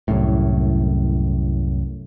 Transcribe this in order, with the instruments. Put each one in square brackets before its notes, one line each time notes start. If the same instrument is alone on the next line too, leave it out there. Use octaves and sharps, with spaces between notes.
[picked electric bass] C2 F#2 A2